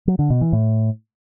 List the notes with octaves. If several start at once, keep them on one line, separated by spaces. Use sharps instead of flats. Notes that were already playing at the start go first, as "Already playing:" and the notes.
F#3
D3
B2
E3
A2